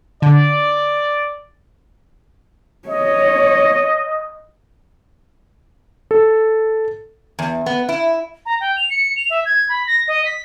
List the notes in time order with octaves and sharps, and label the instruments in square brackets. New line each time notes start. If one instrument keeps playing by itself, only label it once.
[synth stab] D3 [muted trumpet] D5
[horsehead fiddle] C#5 [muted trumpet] D#5
[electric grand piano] A4
[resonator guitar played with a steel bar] E2
B3
E4
[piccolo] A#5
G5
F7
C#7
F7
E5
G#6
B5
A#6
D#5
B6